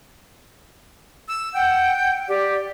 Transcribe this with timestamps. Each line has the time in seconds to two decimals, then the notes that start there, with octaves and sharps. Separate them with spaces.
1.28 E6
1.54 F#5 G5 G6
2.28 G4 D5